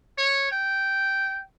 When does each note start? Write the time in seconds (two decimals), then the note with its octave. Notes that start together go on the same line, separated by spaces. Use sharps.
0.18 C#5
0.52 G5